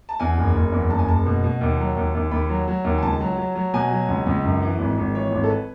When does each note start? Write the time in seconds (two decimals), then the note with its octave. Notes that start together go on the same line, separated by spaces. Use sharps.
0.09 A5
0.20 E2 G#5
0.37 F#1
0.55 F#1
0.72 E2
0.90 F#1 A5
0.99 G#5
1.08 F#1 A5
1.26 B2
1.44 B2
1.61 D#2
1.79 F#3
1.96 D#2
2.15 D#2
2.31 D#2 B5
2.49 F#3
2.68 F#3
2.85 D#2
2.98 G#5
3.03 C#2 A5
3.20 F#3
3.38 F#3
3.55 F#3
3.74 B2 G#5
3.91 F#3
4.08 C#2
4.26 C#2
4.44 F#2
4.62 E3
4.79 G#1
4.98 G#1
5.14 E3 C#5
5.32 G#1
5.44 A4
5.50 B4